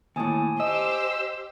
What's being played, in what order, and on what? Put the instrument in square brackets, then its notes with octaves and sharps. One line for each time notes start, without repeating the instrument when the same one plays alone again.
[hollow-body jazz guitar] D#2 A2 [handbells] G#5 A5 D#6
[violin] G4 C5 [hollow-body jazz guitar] D#5 [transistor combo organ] E6